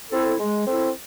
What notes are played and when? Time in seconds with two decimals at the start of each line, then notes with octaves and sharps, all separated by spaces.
0.10 C4 E4 A4
0.39 G#3
0.67 C4 E4 A4